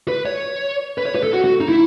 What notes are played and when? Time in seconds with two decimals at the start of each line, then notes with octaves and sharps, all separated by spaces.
0.08 B4
0.26 C#5
0.98 B4
1.05 C#5
1.15 B4
1.23 A4
1.33 F#4
1.44 F#4
1.60 D#4
1.69 E4